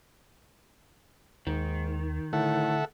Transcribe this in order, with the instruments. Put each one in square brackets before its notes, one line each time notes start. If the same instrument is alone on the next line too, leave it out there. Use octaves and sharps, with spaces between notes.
[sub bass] D#2 [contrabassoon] G#2 [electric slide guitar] D#3
[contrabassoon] A2 [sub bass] D3 [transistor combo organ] A4 E5 F#5